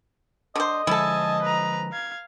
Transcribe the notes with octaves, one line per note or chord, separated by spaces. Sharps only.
D3 C5 D#5
D3 F3 G#3 E4 A4 G#5 A5
B4 A#5
F5 G#6